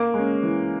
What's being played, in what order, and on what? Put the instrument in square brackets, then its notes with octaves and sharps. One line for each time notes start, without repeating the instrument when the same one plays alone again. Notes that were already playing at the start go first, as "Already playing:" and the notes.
Already playing: [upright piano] A#3
[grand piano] G#3 C#4
E3